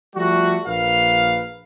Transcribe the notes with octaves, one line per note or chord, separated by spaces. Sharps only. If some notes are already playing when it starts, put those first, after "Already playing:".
F3 G3 A3 F#4
A#1 A#3 B4 F5